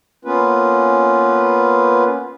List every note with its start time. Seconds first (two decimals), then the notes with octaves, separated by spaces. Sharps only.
0.25 A#3 B3 C#4 F4 B4